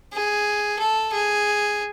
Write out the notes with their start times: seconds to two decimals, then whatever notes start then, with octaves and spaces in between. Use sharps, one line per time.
0.13 G#4
0.79 A4
1.13 G#4